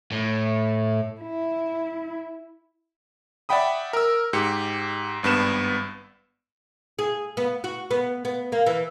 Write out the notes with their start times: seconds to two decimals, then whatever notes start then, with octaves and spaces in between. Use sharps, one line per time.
0.12 A2
1.21 E4
3.49 D5 E5 F#5 G5 B5 D#6
3.93 A#4 E6
4.33 G#2 G4 C#7
5.23 G#1 G2 B3 E7
6.99 G#4
7.37 B3
7.64 F#4
7.91 B3
8.25 B3
8.52 A#3
8.66 E3